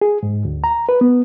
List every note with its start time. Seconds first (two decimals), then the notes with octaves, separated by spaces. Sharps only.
0.01 G#4
0.23 G#2
0.45 D2
0.64 A#5
0.89 B4
1.01 B3